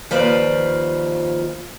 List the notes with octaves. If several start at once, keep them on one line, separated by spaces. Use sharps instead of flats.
D#2 F3 F4 B4 C5 D5